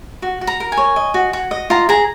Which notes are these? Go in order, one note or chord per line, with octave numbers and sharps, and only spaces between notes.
F#4
F#4
A#5
A#4
G#5
C#5
D#5
F#4
F#4
D#5
F4 A#5
G#4 A#5